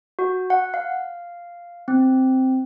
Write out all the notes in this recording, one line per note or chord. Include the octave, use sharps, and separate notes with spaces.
F#4
F#5
F5
C4